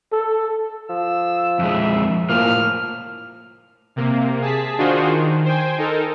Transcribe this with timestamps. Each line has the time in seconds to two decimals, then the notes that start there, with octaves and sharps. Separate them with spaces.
0.12 A4
0.89 F3 E6
1.59 F2 G#3 E5
2.29 A2 F3 A#3 F6
3.96 C3 A#3
4.42 G#4 A5 B6
4.78 D#3 D4 F4 F#4 G#4 C5
5.11 D#3
5.45 C5 G5 G#5
5.78 D#4 A4 A#4